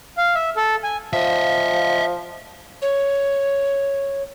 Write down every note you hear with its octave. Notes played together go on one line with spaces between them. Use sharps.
F5
E5
A4
G#5
F3 D#5 E5
C#5